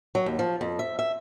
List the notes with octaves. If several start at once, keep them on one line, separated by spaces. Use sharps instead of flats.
F#3
D#2
F3
F2
E5
E5